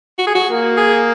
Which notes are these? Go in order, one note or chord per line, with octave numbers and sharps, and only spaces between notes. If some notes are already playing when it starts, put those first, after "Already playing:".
F#4
G#4
F#4
A#3
G#4